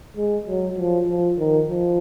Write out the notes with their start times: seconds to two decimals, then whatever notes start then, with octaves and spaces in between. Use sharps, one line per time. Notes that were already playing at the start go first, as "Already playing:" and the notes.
0.16 G#3
0.47 F#3
0.78 F3
1.08 F3
1.39 D#3
1.70 F3